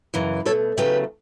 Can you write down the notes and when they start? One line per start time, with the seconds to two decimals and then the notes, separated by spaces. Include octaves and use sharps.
0.14 F#2 C#3 E3
0.45 B2 A3 A4 C#5
0.77 E2 C#3 F#3 A3 G4 B4